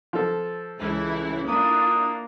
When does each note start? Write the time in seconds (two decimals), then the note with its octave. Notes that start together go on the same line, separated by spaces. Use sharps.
0.13 F3 A4
0.78 C#2 E3 E4
1.46 A#3 D4 E4 F4 D#6